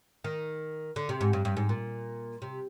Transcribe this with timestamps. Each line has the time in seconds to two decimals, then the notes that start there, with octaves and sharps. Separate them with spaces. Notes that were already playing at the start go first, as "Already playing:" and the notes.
0.24 D#3
0.96 D3
1.09 C3
1.21 G#2
1.33 G2
1.45 G2
1.57 G#2
1.69 A#2
2.42 C3